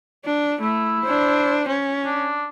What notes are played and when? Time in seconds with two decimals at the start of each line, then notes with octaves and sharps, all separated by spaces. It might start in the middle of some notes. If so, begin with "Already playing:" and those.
0.25 D4
0.61 A3 E4
1.04 D4 C5
1.68 C#4
2.05 D4